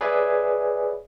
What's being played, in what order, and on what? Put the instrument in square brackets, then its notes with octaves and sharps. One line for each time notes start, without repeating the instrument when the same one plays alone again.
[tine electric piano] G#4 B4 C#5 D5 E5 G#5